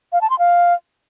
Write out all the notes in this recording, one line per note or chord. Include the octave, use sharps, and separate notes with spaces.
F5
A5
C6
F5